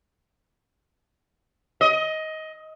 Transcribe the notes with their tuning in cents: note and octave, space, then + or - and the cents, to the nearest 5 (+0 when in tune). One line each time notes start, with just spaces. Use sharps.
D#5 +15